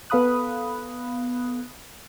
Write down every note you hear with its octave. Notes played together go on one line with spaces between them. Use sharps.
B3 A4 F5 B5 D#6 F#6